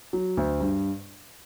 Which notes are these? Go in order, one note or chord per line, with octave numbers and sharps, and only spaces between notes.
F#3
D2
G2